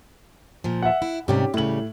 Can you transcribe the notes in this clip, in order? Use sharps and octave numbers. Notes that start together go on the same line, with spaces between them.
A#2 F3
E5 F#5
E4
G#2 C3 G3 C#4 G4
A2 C#3 G3 F#7